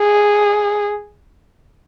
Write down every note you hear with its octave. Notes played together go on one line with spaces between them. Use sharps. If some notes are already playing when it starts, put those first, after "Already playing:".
Already playing: G#4